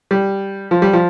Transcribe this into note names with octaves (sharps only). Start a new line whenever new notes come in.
G3
F3
G3
F3